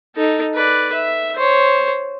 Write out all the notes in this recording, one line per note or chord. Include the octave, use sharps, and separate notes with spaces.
D#4 A4
B4 D5
E5
C5 C#5